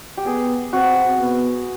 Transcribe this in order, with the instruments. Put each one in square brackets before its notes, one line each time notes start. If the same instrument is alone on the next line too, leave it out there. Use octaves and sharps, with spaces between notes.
[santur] G4
[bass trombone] B3 [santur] G#4
[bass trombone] C4 [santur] F#4
[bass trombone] B3